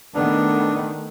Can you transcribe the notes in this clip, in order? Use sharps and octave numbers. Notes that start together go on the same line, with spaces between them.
D#3 A3 B3 D4